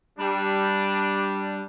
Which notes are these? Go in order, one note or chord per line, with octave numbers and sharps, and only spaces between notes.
G3 D4